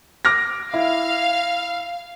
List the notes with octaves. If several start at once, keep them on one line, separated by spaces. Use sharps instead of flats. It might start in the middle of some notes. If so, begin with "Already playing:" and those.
D6 F6 A#6
E4 F5